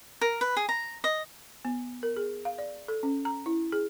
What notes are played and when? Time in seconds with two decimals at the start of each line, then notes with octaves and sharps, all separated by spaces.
0.21 A#4
0.41 B4
0.57 G#4
0.69 A#5
1.04 D#5
1.65 B3
2.03 A#4
2.17 G#4
2.45 F5
2.58 D5
2.88 A4
3.03 C#4
3.25 A#5
3.46 E4
3.72 G#4